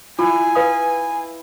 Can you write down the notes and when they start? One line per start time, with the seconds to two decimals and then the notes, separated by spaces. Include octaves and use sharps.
0.19 E4 F4 G#5
0.55 B4 F5 D#6